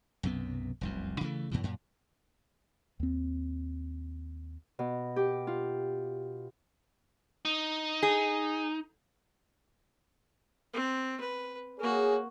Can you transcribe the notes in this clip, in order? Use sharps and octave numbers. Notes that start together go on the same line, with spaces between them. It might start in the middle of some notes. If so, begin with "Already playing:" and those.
B1 F#2 C3 B3
F1 C2 F#2
C#3 E3 A3
F#2 B2 E3
F#2 A#2
D#2 C4
B2
G4
F4
D#4
G#4
C4
B4
A#3 F#4 G#4 C#5